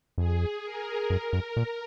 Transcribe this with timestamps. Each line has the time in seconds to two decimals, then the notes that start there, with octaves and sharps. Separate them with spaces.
0.17 F2 G#4
0.63 A#4
1.10 F#2 A#4
1.33 F#2
1.57 A#2